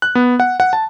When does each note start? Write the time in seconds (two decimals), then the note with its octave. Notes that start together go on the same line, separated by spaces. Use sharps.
0.02 F#6
0.15 B3
0.40 F#5
0.60 F#5
0.73 A5